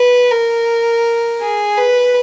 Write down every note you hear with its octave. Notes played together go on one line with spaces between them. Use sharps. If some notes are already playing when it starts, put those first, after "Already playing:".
Already playing: B4
A#4
G#4
B4